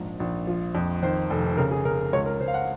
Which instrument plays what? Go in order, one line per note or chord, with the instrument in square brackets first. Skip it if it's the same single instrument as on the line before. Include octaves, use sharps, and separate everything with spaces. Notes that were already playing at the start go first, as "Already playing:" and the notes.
Already playing: [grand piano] A#1 G#2
A#1
F3
F2
D#3 C5
F1
C#3 A#4
G#4
C#3 A#4
C#2 C#5
A#4
C#2 C5
F5
F#5